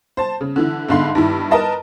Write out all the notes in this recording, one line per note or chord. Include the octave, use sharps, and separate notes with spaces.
C5 A5
C#3
D3 E3 E4
G1 G#2 D3 F5 B5 C6
G2 D#3 E4
A#4 B4 D#5 A5